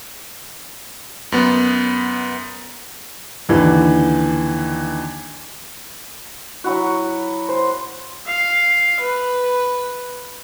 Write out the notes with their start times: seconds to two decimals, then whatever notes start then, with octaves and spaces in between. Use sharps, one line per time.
1.32 F#2 B3
3.49 D#2 D3 E3
6.64 F#3 E4 F#4
7.49 C5
8.27 F5
9.01 B4